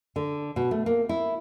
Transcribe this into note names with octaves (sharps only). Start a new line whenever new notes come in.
D3
B2
A3
A#3
E4